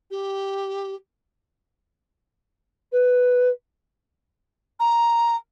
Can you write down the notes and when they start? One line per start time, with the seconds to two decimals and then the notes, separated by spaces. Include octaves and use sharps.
0.11 G4
2.92 B4
4.80 A#5